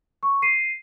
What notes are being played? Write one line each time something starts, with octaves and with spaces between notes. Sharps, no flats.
C#6
C7 D#7